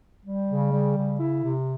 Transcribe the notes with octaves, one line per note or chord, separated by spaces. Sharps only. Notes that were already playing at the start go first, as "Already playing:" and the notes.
G3
C#3
G3
C#3
E4
C3